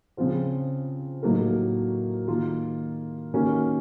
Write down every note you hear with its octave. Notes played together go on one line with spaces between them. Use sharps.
C#3 F3 C4 F4 C5
A2 F#3 A#3 D#4 A#4
D#3 A#3 F4
D#3 A#3 C#4 F#4 A#4